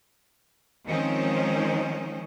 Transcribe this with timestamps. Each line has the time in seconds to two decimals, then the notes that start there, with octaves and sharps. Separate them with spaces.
0.86 D#3 F3 G#3 C4 C#4 D#4